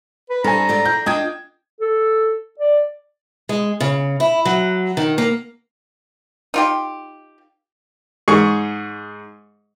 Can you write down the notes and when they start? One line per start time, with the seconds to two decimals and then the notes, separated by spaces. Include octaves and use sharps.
0.30 B4
0.44 G2 C4 A4 G#5 A#5
0.69 G#2 F4 D5
0.85 D4 G6
1.06 D4 F4 D#5 G5 D#6 G#6
1.81 A4
2.60 D5
3.49 G#3
3.80 C#3
4.20 E4
4.45 F#3
4.97 D#3
5.18 A#3
6.54 D#4 F4 G4
8.28 G#2 G#4 C#6